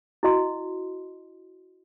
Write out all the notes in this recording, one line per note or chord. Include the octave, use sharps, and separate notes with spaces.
E4 F#4 D#5 C6